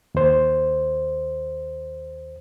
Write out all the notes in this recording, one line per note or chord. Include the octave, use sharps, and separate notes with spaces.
D#2 C5